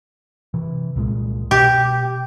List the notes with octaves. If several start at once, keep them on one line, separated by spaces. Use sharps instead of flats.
C3 E3
C2 A#2 G#3
B2 G4